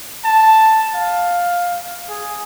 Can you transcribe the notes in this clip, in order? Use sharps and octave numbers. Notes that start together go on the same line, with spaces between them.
A5
F5
G#4